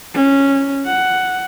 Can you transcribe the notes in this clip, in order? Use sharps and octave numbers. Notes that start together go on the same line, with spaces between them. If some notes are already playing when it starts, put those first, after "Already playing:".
C#4
F#5